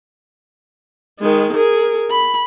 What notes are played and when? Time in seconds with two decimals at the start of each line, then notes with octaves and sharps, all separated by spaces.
1.20 D#3 G#3
1.53 G#4 A#4
2.11 B5